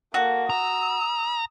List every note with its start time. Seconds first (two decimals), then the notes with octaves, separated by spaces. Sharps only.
0.14 A#3 F#4 A4
0.50 A#5 D#6 E6